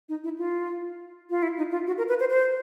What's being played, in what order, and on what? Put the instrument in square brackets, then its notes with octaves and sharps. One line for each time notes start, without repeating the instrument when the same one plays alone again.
[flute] D#4
E4
F4
F4
E4
D#4
F4
F#4
A#4
B4
C5
C5